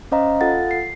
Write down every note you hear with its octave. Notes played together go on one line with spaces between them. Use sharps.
C#4 C5 D#5 F5 A#5
F4 A4 F5 F#5 A6
C7